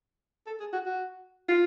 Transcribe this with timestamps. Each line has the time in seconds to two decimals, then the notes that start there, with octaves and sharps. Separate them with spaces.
0.47 A4
0.60 G#4
0.73 F#4
0.86 F#4
1.49 F4